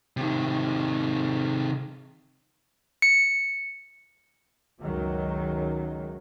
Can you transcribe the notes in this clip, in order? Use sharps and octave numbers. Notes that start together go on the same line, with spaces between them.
C3 D#3
C#7
C#2 F#2 D#3 F#3